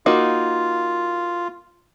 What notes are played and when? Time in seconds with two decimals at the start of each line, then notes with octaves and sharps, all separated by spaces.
0.06 A#3 D#4 F4 F#4